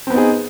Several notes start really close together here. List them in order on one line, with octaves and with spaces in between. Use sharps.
C4 B3 D#4 G#4